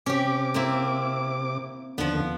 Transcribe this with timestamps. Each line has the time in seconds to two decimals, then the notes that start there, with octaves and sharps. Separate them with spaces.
0.06 C3 C#4 G4 D6
0.54 A#3 C4 E4
1.98 D#2 D3 F3 B3